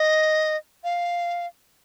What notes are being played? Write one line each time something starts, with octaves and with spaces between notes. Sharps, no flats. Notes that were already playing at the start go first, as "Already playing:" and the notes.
Already playing: D#5
F5